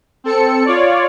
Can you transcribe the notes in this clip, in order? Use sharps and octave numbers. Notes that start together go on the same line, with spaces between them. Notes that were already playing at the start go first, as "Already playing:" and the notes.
C4 A4 C#7
F4 C#5 D5